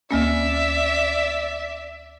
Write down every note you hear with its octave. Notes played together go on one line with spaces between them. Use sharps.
D2 A#3 C#4 D5 E5